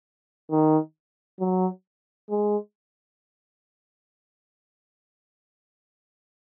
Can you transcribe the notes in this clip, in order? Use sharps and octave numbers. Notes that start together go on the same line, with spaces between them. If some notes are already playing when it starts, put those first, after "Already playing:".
D#3
F#3
G#3